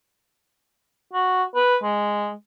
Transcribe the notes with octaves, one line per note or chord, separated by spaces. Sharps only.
F#4
B4
G#3